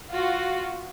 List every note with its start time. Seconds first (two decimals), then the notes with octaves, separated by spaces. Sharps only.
0.11 F4 F#4